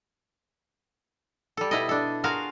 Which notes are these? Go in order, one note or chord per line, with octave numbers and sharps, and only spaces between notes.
G3 A4
B2 E4 D#5
D4 A4
F4 F#4 G#4 A#4 F5